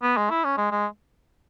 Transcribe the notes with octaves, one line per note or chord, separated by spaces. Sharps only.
B3
G#3
E4
C#4
G#3
G#3